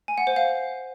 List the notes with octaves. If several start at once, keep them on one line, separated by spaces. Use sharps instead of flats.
G#5
F#5
C5
F5